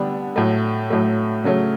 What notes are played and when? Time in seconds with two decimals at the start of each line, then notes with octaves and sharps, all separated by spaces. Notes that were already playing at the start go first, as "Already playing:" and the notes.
Already playing: D3 G3 B3 D4
0.36 A2 F#3 A3
0.90 A2 F#3 A3
1.44 C#3 F#3 A3 C#4